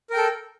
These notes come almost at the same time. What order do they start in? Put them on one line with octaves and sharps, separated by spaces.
A#4 G5 A4